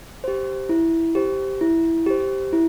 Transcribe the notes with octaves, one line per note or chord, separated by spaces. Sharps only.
G4 C5
E4
G4 C5
E4
G4 C5
E4